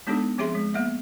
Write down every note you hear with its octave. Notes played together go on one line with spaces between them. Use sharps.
G#3 B3 D4 D#4 G4 A4
F3 C4 G4 G#4 E5 C6
G#3
A#3 B3 D#5 E5